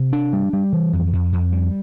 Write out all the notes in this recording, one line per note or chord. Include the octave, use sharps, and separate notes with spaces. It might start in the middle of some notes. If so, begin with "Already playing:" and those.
Already playing: C3
D4
G3
G3
E3
F2
F2
F2
G3